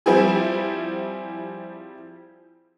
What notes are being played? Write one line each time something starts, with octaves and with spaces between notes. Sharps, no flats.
F3 G3 C4 E4 G#4